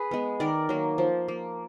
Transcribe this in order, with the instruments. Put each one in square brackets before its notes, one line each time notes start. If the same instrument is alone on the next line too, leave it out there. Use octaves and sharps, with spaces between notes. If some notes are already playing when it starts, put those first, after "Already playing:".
Already playing: [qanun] G#4 B4
G#3 B3
D#3 A#4 D5
F#3 A#3
F3
A#3